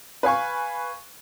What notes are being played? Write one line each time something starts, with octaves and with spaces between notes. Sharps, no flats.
B4 F5 G#5 C#6